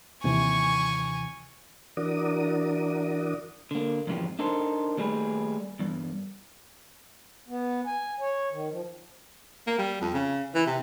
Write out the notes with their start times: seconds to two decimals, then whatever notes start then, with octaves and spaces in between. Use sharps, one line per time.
0.24 D#2 C3 E3 G#5 C#6
1.97 E3 D4 F#4 A#4 D5 D#6
3.71 D3 A#3
4.07 F2 G#2 C#3 E3 F3 G4
4.39 D4 D#4 A4 A#4 C5
4.97 D#2 G3 A3 G#4 B4
5.79 E2 G2
7.49 B3
7.86 G#5
8.20 C#5
8.52 D#3
8.69 F3
9.67 A#3
9.78 G3
10.01 F2
10.14 C#3
10.54 E3
10.67 C3